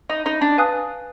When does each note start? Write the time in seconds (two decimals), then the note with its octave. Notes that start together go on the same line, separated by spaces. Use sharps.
0.10 D#4
0.26 D#4
0.41 D4
0.58 B4 F5 G#5 D#6 F#6